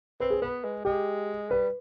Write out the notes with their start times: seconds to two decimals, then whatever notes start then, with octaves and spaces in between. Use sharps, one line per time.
0.20 C4 B4
0.30 G#4
0.42 B3 B4
0.64 G#3
0.85 G#3 G4
1.50 G3 B4